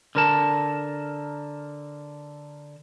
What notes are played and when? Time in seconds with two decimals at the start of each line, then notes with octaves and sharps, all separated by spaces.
0.15 D3 A#4 A5